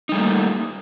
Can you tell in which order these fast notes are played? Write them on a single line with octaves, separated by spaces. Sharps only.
D#4 G3 A3 A#3